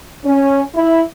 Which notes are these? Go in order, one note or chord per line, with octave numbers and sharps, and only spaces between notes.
C#4
E4